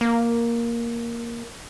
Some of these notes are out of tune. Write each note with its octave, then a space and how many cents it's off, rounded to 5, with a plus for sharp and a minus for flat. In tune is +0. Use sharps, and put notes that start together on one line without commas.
A#3 +5